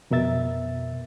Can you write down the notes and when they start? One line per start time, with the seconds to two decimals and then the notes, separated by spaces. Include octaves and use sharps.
0.11 F2 B2 A#4 E5 A6